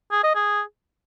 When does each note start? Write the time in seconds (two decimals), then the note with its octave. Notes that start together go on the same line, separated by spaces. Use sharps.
0.12 G#4
0.24 D#5
0.35 G#4